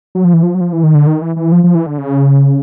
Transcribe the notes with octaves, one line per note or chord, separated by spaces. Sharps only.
F#3
F3
E3
F3
F#3
F3
E3
D#3
D3
D#3
E3
E3
F3
F3
E3
D3
C#3